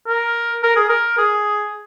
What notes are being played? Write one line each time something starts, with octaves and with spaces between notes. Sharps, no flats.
A#4
A#4
G#4
A#4
G#4